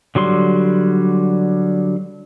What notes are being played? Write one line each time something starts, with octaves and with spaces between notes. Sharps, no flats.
D3 F#3 G3 C6